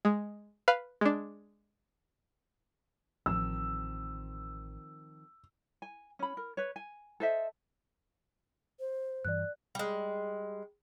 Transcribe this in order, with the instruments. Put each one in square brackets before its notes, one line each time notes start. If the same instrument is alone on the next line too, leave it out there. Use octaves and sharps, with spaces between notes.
[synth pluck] G#3
B4 F5
G#3 D4
[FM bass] A1 [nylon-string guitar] D#3 F3 C4 [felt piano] E6
[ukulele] G#5
C#4 B5
A#4
B4 C#5
G#5
A4 C5 D#5 E5
[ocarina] C5
[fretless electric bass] G2 E3 [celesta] D5 F#6
[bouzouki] G3 G#3